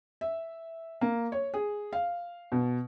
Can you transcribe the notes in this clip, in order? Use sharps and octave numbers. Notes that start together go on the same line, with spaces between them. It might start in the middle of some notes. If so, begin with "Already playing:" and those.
E5
A#3
C#5
G#4
F5
B2